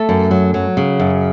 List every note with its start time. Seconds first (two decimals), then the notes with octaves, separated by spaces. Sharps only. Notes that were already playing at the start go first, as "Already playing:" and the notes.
Already playing: A3 A4
0.09 F#2
0.31 F#3
0.54 F#3
0.77 C#3
1.00 F#2